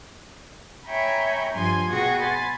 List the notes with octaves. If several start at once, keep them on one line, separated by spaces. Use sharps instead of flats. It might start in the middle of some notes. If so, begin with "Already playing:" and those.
C#5 E5 G5 G#5 A#5 B5
G2 F3 G#5 C6
B2 F#4 G#4 G5 G#6 A#6
G#5 B5 C6 A6